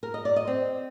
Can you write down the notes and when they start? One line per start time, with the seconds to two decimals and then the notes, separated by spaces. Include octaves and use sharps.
0.03 A#4
0.14 D#5
0.25 D5
0.36 D#5
0.47 C4